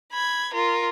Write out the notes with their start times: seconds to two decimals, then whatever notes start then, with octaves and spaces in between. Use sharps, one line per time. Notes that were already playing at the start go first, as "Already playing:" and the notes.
0.12 B5 G#6
0.53 F4 A#4